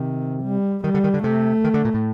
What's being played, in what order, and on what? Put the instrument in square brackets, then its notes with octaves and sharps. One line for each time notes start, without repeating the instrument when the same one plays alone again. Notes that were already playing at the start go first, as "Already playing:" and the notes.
Already playing: [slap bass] C3 [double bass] D#3
[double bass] G3
[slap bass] D#3 [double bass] G3
[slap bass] D3
D#3
D3
[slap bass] C3 [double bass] A3
[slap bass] D#3
D3
A#2
A2